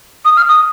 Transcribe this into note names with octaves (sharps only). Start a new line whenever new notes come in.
D#6
F6
D#6